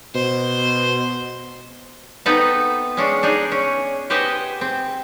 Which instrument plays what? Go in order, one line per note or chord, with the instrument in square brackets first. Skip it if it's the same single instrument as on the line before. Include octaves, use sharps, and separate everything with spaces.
[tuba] B2 [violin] C5
[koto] B3 C4 D#4 A4 B4
G#3 C#4 D4
D4 D#4 G#4
C#4
G4 B4 C5 D#5 F#5 G#5
C4